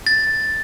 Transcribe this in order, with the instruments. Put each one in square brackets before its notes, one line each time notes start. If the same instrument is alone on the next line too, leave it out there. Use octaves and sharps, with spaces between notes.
[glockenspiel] A6